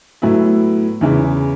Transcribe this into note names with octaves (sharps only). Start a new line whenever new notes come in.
A2 F#3 B3 E4
E2 C#3 E3